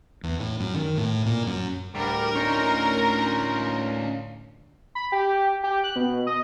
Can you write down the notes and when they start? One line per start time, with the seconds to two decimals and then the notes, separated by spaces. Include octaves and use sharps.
0.23 E2
0.40 A2
0.60 F#2
0.75 D#3
0.98 A2
1.26 A#2
1.46 F#2
1.95 D2 A2 G3 D4 A#4
2.35 C#4 D#4 F4 C#5
4.95 B5
5.12 G4
5.64 G4
5.84 F#6
5.96 B2
6.27 D#5